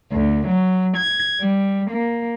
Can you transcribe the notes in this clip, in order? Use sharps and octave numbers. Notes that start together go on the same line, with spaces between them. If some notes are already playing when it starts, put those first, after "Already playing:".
D2
F#3
G#6
G3
A#3